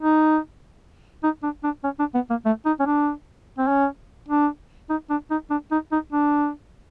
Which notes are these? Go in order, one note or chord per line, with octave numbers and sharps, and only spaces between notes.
D#4
D#4
D4
D4
C#4
D4
B3
A#3
A3
D#4
C#4
D4
C4
C#4
D4
D#4
D4
D#4
D4
D#4
D#4
D4